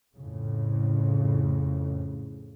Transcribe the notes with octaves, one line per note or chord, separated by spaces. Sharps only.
F2 A2 C#3